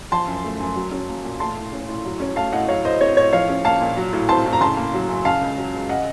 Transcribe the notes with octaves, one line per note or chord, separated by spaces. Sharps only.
F3 A5 C6
F#2
A3
F#2
F#3
C#4
A#3
A#2
A3 A5 C6
A2
C#4
A2
F#3
C#4
A3 F5 A5
A2 D#5 F#5
F#3 C#5 F5
A2 C5 D#5
C4 C#5
A2 C#5
F3 C#5 F5
C#4
A#3 F5 A5
A#2
F#3
A2
C4 A5 C6
A2
A#5
C#3 A5 C6
A#3
F#3
F#2
C#3 F5 A5
C#2
F#3
C#2
C#3 D#5 F#5